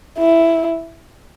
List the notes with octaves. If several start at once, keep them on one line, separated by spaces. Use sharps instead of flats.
E4